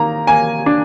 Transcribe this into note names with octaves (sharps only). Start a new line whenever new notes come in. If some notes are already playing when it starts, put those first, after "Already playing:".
Already playing: D#3 A#3 A#5
A#3 G#5
D4